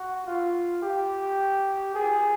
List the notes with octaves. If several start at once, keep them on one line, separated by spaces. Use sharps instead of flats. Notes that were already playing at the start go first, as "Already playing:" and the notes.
Already playing: F#4
F4
G4
G#4